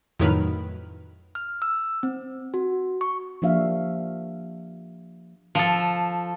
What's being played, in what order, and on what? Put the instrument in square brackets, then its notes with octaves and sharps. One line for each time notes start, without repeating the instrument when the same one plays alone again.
[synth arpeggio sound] F2 A2 D#3 F#3 B4 F6
[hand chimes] F6
E6
C4
F#4
C#6
[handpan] F3 A#3 D4 G4 E5 F5
[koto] F3 A4